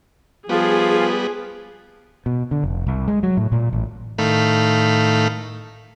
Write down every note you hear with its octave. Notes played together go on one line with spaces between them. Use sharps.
F3 G3 B3 G#4
B2
D3
F1
C2
G#3
F#3
A2
A#2
A1
A2 D#3 A3 F5 B5